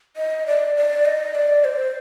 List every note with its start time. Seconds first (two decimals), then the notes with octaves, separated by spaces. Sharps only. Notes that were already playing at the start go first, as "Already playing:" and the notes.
0.17 D#5
0.47 D5
0.76 D5
1.05 D#5
1.35 D5
1.64 C5